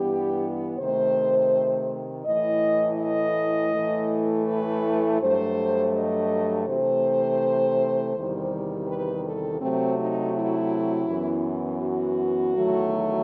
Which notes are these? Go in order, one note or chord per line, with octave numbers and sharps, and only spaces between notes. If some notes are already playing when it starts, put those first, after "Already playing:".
Already playing: G2 E3 B3 G4
C3 D#3 A3 C5
A2 E3 A3 D#5
D#5
A2 E3 A3
B4
G2 F#3 A3 C5
D#5
C3 E3 A3 C5
E2 C3 D#3 G3
B4
A4
C3 F#3 A3 C4
D#4
E4
F#2 E3 B3
F#4
E2 D#3 F#3 A3